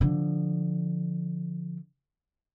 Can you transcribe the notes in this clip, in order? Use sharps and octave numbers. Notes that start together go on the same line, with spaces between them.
D3 F3